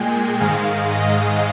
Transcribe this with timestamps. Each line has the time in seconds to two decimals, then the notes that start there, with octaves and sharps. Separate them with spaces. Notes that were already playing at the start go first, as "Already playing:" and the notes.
Already playing: A#2 G#3 G5 G#5
0.40 G#2 D#3 G#3 F5
0.91 D#5